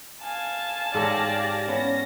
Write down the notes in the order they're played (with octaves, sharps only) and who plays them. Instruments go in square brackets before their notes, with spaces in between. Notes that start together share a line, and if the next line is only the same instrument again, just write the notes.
[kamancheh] F5 G#5 [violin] A5
[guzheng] G#2 A4 C#5 [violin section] G4 D5 A#6
[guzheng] B3 E4 [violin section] C#4 A#6